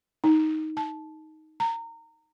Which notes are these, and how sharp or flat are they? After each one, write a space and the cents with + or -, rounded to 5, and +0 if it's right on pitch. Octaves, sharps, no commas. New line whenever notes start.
D#4 +10
A5 -15
A#5 -25